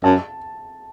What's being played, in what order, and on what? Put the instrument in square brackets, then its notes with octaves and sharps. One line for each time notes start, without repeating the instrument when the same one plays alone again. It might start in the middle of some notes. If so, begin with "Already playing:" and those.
[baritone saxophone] F#2 [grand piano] A5